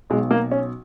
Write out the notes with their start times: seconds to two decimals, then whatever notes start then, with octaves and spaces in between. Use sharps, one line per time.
0.10 B1 B2 G#3
0.31 A#3
0.51 C#4